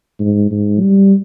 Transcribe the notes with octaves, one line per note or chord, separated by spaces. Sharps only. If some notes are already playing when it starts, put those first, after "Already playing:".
G#2
G#2
G3